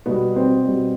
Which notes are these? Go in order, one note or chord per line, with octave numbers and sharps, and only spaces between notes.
B2 G3 B3
C4
B2 G3